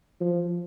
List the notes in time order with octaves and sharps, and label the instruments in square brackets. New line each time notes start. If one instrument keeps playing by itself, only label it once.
[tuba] F3